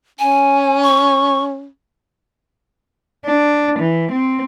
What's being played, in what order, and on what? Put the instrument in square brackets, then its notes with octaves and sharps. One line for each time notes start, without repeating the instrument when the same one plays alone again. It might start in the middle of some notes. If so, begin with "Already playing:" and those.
[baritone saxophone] C#4 [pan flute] G#5
[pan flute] C#6
[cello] D4
E3
C4